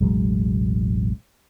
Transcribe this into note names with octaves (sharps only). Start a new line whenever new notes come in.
E1 A1 F#3 G#3